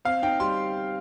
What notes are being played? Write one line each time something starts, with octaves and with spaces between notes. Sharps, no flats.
C4 F5
D#4 G5
G3 C6